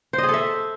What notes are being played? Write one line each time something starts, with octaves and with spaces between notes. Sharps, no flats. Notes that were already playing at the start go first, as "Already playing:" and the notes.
C5
D#5
G#4
A4
E5